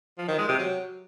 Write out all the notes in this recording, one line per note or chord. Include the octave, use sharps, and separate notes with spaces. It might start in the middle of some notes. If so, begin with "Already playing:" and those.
F3
D#3
G#3
C3
F#3